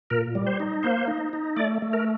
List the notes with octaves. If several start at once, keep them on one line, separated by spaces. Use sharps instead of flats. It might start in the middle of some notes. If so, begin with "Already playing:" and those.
A#2 A#4
G3
C5
D#4
A#3 C5
D#4
D#4
A3 D5
A3
A#4